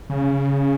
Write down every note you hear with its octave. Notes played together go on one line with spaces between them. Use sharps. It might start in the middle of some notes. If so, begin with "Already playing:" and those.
C#3